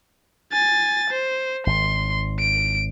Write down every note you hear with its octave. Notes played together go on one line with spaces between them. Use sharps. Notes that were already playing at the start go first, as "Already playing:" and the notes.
G#5 A6
C5
G#1 C6
D7